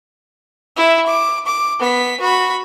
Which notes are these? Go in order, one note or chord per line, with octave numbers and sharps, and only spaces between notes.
E4 E5
D6
D6
B3 B6
F#4 B5